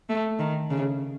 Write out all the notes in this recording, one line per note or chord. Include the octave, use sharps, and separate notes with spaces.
A3
D#3
C#3